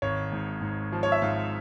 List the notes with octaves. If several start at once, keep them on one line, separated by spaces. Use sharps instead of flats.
G#1 C#5
G#2
G#2
F3
C#5
E5
G#2 F5